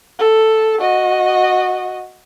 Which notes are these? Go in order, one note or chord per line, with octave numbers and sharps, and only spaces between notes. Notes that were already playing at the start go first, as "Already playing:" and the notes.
A4
F#4 D#5